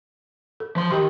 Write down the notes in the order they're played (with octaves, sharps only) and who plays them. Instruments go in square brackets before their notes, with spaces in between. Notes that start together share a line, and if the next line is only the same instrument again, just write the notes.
[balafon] A4
[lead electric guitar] F3 C6
[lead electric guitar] D#3 [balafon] G4 G5